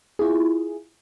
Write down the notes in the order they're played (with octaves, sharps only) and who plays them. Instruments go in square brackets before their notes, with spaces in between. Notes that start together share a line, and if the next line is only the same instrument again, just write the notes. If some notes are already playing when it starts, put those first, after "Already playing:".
[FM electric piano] E4 F4 G#4